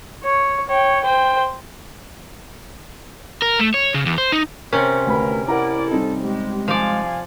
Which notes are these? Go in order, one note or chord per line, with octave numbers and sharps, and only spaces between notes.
C#5
C#5 G5
C5 G5
A#4
A3
C#5
C#3
E2
C5
D#4
C3 C#4 A#4 C5 C#5
G#1 D2 A#4 B4 B5
E4 A#4 D5 F#5 A#5
G3 C4 D#4 A4
G#3 G4
F3 D5 F5 G#5